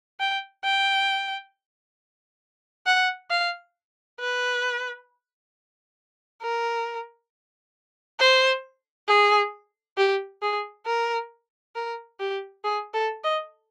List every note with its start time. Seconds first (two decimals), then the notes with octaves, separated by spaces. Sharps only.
0.20 G5
0.65 G5
2.86 F#5
3.31 F5
4.20 B4
6.43 A#4
8.20 C5
9.08 G#4
9.98 G4
10.42 G#4
10.86 A#4
11.75 A#4
12.20 G4
12.64 G#4
12.94 A4
13.24 D#5